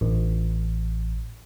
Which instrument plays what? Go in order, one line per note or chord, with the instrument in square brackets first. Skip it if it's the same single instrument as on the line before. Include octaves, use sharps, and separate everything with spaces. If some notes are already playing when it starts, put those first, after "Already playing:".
[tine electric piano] A1